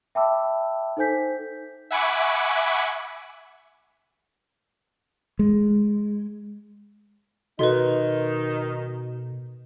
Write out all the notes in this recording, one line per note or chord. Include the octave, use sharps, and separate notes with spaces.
E5 G5 A5 B5 D6 E6
D#4 A4 C5 G#5 G6 B6
E5 F#5 G#5 B5 C#6 D6
G#3
B2 D#3 D#4 F#4 A4 B4 D#5 C6